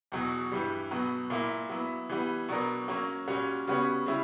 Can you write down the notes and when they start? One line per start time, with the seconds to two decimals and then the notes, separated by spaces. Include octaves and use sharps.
0.12 E2 B2 F#3
0.52 G2 E3 G3
0.91 B2 F#3 B3
1.30 A#2 A#3 E4
1.69 F#3 B3 E4
2.09 E3 G3 B3
2.48 B2 F#3 B3 D4 A#4
2.88 F#3 A#3 C#4
3.28 A#2 G3 C#4 F#4 C#5
3.67 C#3 G3 B3 F#4 C#5
4.06 C#3 G3 C#4 E4